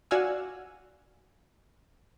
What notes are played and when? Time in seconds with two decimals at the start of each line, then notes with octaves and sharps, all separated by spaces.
0.11 F#4 D5 F5 F#5 G#5 E6